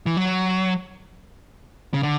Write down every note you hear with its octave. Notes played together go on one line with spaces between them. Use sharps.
E3
F#3
C#3
D3